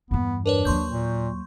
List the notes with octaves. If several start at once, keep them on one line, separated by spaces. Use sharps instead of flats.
E2 G2 B3
D4 A#4 B4 C#5
D#2 F#3 C6 C#6 G6
A#2